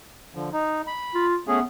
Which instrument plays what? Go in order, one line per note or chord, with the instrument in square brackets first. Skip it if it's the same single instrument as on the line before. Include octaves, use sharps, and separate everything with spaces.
[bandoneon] D3 F3
D#4
B5
[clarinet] F4
[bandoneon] A3 C#4 G#4 [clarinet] B3